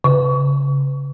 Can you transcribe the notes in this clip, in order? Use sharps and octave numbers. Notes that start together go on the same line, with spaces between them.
C#3